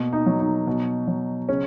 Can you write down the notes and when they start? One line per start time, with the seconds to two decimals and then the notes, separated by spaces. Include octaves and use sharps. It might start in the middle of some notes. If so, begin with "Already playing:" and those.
Already playing: B2 A#3
0.13 D#4
0.26 F#3
0.40 D#4
0.67 B2
1.07 F#3
1.49 C#3 C#4